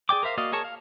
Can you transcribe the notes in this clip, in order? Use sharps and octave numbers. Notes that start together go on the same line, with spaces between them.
G#4 D5 G5 D6
A#4 C5 E5 F5
A#3 F#4 D5 D#5 F5
G#4 A#4 C#5 A5 C#6
F5